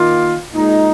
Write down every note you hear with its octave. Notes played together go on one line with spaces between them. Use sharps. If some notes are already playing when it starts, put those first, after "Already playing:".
Already playing: D#3 A#3 F4
A#2 G#3 D#4